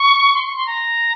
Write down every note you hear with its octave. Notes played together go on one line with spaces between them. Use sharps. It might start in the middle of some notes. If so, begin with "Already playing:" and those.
Already playing: C#6
C6
C#6
C6
A#5